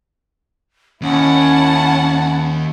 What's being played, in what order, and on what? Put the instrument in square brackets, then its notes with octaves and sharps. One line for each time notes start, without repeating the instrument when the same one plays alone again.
[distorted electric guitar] D#2 [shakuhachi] C#4 [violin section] E4 F#5 A5